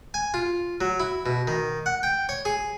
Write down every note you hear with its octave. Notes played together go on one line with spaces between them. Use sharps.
G#5
F4
F#3
E4
B2
D#3
F#5
G5
C#5
G#4